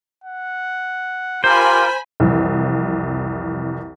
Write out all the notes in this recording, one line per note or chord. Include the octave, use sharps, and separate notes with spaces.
F#5
F4 G4 A#4 C5 G#5 B5
C2 F2 E3